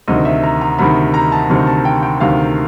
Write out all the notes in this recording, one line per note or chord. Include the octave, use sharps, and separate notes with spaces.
D2 C3 D#3 D#5
E5
A#5
A#5
D2 C3 D#3 B5
A#5
A5
D2 C3 D#3
A5
G5
G5
D2 C3 D#3 F5